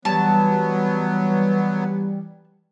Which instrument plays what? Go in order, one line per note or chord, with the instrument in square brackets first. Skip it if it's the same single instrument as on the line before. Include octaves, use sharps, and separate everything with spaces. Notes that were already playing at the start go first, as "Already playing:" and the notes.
[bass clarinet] E3 [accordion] F#3 B3 [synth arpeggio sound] G3 [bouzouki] A5